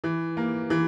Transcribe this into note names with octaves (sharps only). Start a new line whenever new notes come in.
E3
A#3
E3